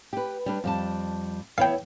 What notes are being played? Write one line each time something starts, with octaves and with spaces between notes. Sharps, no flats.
G4 B4
G3 D4 B4
F2 G3 A5
B3 E4 C#5 F5 G5